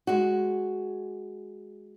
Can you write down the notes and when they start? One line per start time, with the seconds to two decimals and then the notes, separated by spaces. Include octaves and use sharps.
0.07 G#3 F#4